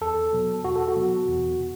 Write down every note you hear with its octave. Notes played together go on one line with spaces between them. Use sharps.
E2 A4
B2 F#3
E2 F#4
A4
F#4
B2 F#3
E2
B2